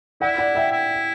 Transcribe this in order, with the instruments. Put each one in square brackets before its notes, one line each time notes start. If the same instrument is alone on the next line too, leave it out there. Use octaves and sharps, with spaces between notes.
[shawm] E4 [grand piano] D5 F#5
[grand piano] D5 F#5
E5 G5
[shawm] E4